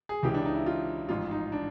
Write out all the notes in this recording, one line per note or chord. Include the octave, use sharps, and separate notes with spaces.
G#4
C#2 C#3 E3 G4
D4
D#4
E4
F4
A1 G#2 F3 F4
D#4
D4